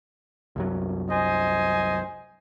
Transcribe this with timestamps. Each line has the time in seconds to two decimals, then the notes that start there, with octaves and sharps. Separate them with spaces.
0.56 C2 F#2 F#3
1.10 C5 D#5 G#5